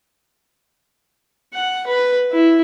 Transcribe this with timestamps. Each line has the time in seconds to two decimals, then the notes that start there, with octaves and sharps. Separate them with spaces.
1.53 F#5
1.87 B4
2.32 E4